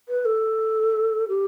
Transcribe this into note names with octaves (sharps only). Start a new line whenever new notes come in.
B4
A4
G4